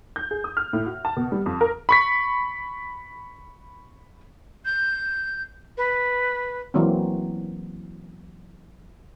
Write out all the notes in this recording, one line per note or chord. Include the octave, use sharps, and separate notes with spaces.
G6
G#4
D#6
F6
A2
F#4
A5
B2
G3
F2
A#4
B5 C#6 B6
G6
B4
E3 F#3 A#3 C4